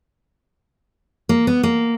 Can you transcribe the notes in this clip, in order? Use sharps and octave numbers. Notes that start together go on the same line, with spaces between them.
A#3
B3
A#3